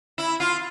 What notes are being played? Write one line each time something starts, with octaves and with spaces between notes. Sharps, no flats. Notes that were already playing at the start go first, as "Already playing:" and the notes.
E4
F4